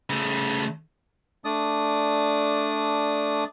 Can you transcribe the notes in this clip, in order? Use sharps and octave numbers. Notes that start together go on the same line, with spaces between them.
C#3 A3
A3 D4 D5 D#6